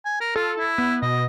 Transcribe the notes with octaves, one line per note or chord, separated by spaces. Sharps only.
G#5
A#4
F4 A4
E4
B3
B2 D#5